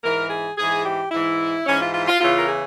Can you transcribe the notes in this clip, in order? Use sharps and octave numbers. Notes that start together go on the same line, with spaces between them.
G#2 E3 A#4
G#4
G#2 E3 G#4
G4
G#2 E3 E4
G#2 E3 C#4
F4
F4
F4
E2 C#3 E3 F4
A#4
G#4